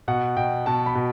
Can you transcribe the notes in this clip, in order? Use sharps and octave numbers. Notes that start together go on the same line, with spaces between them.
B2 F#5
B2 G5
B2 A5
B5
B2